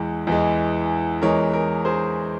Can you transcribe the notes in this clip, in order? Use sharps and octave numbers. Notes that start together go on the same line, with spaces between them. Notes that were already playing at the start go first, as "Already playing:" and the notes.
Already playing: E2 E3 G#3
E2 E3 G#3
E2 E3 G#3 A#4 C#5
A#4
G#4 C5